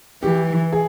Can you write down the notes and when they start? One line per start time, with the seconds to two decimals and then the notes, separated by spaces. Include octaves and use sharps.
0.23 E3 G4
0.73 G#4